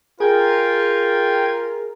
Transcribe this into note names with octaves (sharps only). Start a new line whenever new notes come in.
F4 G#4 A#4 G5 G#6